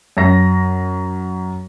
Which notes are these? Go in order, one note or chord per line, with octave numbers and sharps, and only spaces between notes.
F#2 A#6